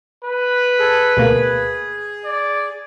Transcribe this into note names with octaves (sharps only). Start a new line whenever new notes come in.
B4
G#4 A4
D2 B2 A#3 G#4
D5